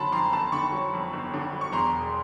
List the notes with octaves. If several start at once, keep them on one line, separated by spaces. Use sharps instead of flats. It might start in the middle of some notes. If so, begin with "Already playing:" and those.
Already playing: G1 F2 D3 F#3 A5 B5 C6
F2 A#5 C6
G1 A5 B5
D3 B5 C#6
F#3
F2
G1
D3
F#3
C#6
E2 A#5 C6
E1